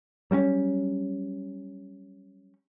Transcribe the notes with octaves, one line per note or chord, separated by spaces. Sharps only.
F#3 G3 C4 C#4